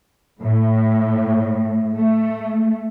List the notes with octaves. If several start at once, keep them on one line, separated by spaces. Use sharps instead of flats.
A2
A3